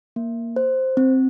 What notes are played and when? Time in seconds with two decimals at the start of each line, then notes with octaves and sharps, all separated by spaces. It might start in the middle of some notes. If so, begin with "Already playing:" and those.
0.16 A#3
0.56 C5
0.97 C4